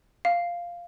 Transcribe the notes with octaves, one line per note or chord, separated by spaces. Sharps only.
F5